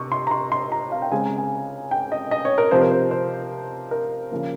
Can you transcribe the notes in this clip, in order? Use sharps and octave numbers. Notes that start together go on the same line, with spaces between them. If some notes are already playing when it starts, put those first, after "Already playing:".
Already playing: C3 C#6
C6
A#5
C6
C6
A#5
F5
G5
C#3 G#3 C4 G#5
A#5
G#5
G5
D#5
D#5
C#5
A#4
C3 F3 C4 C5
A#4
C5
C5
A#4
C#3 F3 A#3